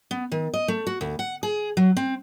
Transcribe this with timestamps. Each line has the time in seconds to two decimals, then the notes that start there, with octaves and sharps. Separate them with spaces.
0.11 B3
0.32 D#3
0.54 D#5
0.68 A3
0.87 F#4
1.01 D2
1.19 F#5
1.43 G#4
1.77 F#3
1.97 C4